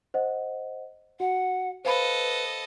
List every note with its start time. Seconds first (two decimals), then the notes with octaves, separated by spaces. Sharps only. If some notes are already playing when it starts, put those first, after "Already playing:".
0.14 C5 D#5 F#5
1.20 F#4 F#5
1.85 A4 B4 C5 D#5 F5 B5